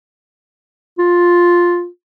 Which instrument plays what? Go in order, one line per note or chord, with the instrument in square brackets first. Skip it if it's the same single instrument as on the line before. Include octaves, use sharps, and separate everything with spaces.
[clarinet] F4